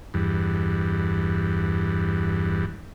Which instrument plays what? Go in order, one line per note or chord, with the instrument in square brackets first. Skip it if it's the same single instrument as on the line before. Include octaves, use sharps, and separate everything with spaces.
[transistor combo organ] E2 G2